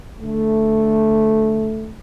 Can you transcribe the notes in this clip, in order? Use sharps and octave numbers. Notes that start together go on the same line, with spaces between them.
D3 A3